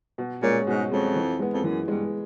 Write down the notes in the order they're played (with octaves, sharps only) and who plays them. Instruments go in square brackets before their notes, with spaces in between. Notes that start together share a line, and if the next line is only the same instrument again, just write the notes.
[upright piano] B2
[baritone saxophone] A#2 [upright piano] G#3 C#4
[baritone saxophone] G#2 [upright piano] B2
[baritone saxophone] F2 [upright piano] G#3 C#4
[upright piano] E3
G#3 B3
[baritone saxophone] F2
[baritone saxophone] F#2 [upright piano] E3
[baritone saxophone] G2 [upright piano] G#3 B3